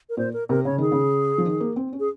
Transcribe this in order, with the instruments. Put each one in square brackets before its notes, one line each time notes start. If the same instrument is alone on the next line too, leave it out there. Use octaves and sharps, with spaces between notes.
[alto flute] A#4
[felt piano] A#2 [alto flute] C5
[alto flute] A#4
[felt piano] C3 [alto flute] A#4
[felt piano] C#3 [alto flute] C#5
[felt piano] D#3 [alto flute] G#4
[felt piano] C#3
F3
D#3
A#3
C4
C#4
[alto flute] G#4